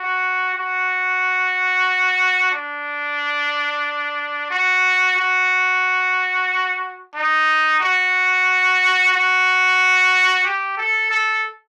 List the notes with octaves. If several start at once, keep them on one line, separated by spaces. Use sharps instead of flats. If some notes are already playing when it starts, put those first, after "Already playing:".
Already playing: F#4
F#4
D4
F#4
F#4
D#4
F#4
F#4
G4
A4
A4